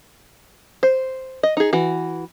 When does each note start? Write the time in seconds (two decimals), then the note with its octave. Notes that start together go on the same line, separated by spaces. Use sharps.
0.83 C5
1.43 D#5
1.57 D#4 G#4
1.73 E3 F#4